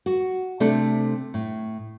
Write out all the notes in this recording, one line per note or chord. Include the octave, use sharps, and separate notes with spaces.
F#4
C3 A3 C4 D4 A4
A2